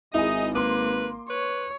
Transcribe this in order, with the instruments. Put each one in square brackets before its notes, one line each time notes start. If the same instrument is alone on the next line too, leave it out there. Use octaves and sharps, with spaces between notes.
[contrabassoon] G#1 [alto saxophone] D#4 [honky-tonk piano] E4 G#4 [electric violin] D#5
[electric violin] A#3 [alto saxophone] B4 [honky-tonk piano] C6 D6
[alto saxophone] B4 [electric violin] C#5